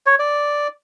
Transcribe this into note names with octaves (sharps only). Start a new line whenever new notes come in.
C#5
D5